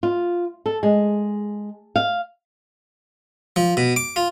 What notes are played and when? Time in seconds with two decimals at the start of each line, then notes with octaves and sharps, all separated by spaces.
0.03 F4
0.66 A4
0.83 G#3
1.96 F5
3.56 F3
3.77 B2
3.96 D6
4.16 F4